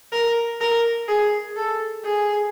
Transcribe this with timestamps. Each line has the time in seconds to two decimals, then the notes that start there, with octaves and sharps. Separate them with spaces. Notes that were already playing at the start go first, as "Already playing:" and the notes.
0.12 A#4
0.61 A#4
1.08 G#4
1.56 A4
2.04 G#4